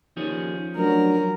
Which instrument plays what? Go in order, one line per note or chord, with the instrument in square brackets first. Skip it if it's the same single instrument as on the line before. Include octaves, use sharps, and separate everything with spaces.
[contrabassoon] D#2 [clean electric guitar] F3 C#4 G#4
[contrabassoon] D2 [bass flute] F#3 [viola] A#4